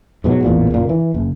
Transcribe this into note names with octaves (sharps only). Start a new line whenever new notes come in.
G#2 B2 F3 F#3
A1 E2 A#2
F#1 A#2
E3
F#1